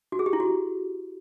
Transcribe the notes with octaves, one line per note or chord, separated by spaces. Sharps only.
F#4
G#4
G4
E4
F#4